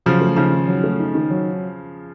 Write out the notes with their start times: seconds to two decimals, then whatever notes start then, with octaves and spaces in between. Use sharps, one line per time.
0.06 C#3 F3 F#3
0.21 A3
0.37 C#3 F3 D#4
0.52 D#3
0.68 F#3
0.84 A3
0.99 D#4
1.15 D#3
1.30 F#3